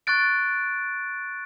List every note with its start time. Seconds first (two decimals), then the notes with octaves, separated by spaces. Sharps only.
0.07 C#6 F#6 A6 D7